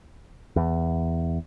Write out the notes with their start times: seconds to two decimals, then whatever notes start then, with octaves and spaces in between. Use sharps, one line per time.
0.56 E2